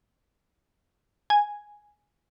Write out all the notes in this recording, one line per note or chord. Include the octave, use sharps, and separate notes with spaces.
G#5